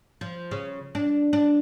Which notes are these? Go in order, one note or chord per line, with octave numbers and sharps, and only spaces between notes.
F3
C#3
D4
D4